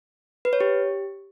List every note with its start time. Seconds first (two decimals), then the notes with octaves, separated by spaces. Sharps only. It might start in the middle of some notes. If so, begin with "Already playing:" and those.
0.45 B4
0.53 C#5
0.60 G4